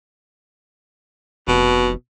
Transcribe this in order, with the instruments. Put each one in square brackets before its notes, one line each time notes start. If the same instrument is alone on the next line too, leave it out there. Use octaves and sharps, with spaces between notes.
[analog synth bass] F1 [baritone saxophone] B2